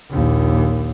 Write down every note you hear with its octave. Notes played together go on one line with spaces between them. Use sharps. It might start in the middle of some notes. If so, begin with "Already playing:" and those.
A#1 D#2